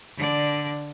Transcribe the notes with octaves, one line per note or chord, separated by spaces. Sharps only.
D3 D5